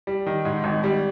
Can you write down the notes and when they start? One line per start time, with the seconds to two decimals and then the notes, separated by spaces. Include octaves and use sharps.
0.07 G3
0.26 D#3
0.45 G#2
0.64 G#1
0.84 G3